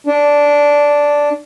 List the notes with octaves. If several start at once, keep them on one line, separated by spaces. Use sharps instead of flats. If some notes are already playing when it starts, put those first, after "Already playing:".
D4